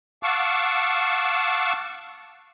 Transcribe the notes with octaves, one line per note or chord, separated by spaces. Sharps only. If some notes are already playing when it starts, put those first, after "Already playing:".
F5 F#5 A5 C#6 D6 E6